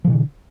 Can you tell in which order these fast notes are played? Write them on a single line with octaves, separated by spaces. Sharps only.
F3 B2 E3 D3